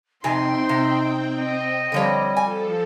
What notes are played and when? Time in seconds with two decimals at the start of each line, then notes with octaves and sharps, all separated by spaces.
0.24 F2 C3 C4 D#4 G5 G#5 C6
0.69 C3
1.40 D#5
1.92 D3 F3 G3 C#5
2.37 F3 A4 G#5